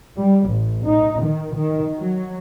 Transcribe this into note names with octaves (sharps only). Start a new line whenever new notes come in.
G3
A1
D#4
D#3
D#3
F#3